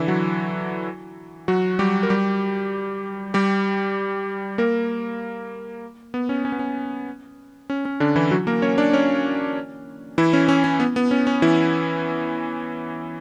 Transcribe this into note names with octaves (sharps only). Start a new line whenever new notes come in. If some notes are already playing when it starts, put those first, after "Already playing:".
Already playing: D3 E3 D4 E4
F#3 F#4
F#3 F#4
G3 G4
A#4
G3 G4
G3 G4
A#3 A#4
B3
C#4
C#4
B3
C#4
C#4
C#4
D3 D4
E3 E4
F#3 F#4
A#3 A#4
C#4 C#5
D4 D5
C#4 C#5
E3 E4
C#4
C#4
C#4
B3
B3
C#4
C#4
E3 E4